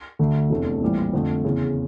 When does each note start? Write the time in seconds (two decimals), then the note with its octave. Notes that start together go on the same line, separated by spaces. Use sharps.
0.19 D2 D3 A3
0.50 F1 E2 D3 A3
0.82 A#1 A2 E3 G3
1.13 F2 D3 A3
1.44 E2 C#3 E3